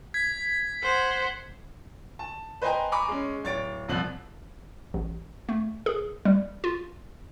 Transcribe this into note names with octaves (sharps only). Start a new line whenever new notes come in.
G#6 B6
C5 F#5
A5
B4 C5 D#5 G5 G#5 A#5
G#5 A#5 B5 C#6 D6
G#3 C#4
D1 C#5 A6 D7
D#1 C2 F2 F3 F#6 F#7
A1
A3
G#4
G3
F4